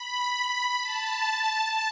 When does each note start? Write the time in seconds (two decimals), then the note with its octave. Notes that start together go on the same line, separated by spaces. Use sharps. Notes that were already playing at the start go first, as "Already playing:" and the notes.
Already playing: B5
0.30 B5
0.81 A5